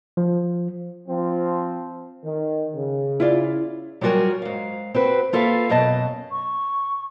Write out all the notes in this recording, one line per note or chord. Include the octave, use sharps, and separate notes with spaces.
F3
F3 C4
D#3
C#3
E4 F4 D5
F#3 G3 F4 F#4 A#4 G#5
G#2 F5
C4 F#4 B4
A#3 F4 A4 B4 E5 F5
F#2 B2 D#5 A5
C#6